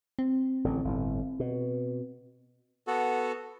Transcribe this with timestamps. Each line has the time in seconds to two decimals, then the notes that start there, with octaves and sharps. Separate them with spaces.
0.19 C4
0.64 A1 D3
0.85 G1 A2
1.40 B2
2.87 B3 F#4 A4